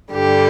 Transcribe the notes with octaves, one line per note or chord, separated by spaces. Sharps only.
G2 D3 G3 G4